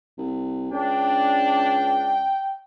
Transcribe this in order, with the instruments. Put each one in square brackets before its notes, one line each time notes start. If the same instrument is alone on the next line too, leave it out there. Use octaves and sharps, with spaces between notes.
[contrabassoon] C2
[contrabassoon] C#2 [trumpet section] D4 [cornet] G5